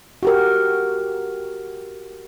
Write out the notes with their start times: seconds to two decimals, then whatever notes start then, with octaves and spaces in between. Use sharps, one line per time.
0.23 F#4 G4 A#4